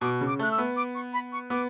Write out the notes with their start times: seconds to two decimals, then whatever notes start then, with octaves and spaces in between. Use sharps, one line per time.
0.01 B2 D6
0.21 C#3
0.27 D6
0.39 A3 F#6
0.51 E6
0.58 B3
0.77 D6
0.95 C#6
1.13 B5
1.32 C#6
1.50 B3 D6